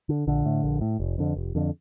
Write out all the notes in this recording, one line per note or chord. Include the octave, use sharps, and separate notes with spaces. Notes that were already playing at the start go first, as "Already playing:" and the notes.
D3
A#1 D3
A2
A#1
A2
F1
F2 D3
F1
F2 D3